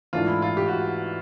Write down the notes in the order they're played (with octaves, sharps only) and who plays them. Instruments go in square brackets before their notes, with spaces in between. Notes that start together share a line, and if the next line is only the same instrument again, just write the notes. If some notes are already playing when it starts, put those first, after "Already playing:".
[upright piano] G#2 E3 A3 D4 [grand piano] F4
[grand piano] E4
F4
G4
F#4